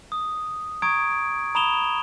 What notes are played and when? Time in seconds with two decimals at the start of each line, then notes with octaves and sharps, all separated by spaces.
0.12 D#6
0.82 A#5 C#6 D#6 G#6 D7
1.55 A#5 B5 D#6 E7 F7 G7